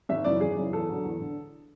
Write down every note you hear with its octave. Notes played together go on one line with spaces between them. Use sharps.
G#1 E5
F#2 C#3 E3 D5
G#1 G#4
F#2 C#3 E3
E2 A4
D3 F#3
E2
D3